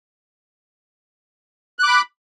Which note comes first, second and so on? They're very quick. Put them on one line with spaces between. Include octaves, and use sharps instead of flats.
F#6 D6 B5